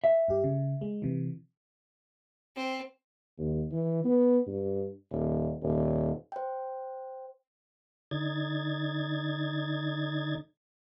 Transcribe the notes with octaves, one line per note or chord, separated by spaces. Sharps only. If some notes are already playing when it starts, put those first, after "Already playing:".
E5
G2 G4
C#3
G#3
C3 E3
C4
D#2
E3
B3
G2
D#1
D#1
C5 G5
D3 D#4 G#6 A6